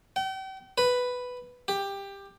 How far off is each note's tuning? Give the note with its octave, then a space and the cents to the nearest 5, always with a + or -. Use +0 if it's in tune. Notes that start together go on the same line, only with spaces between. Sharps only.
G5 -40
B4 +5
G4 +15